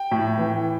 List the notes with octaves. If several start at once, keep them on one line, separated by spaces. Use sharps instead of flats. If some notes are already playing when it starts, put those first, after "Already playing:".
Already playing: G5
A2
E3